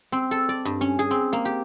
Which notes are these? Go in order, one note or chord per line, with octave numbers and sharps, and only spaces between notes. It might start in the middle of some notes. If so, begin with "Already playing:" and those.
C4
A4
D5
G2
C#4
G#4
C4
A#3
G4